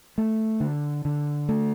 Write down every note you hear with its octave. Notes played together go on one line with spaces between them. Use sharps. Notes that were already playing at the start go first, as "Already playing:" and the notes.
A3
D3
D3
A3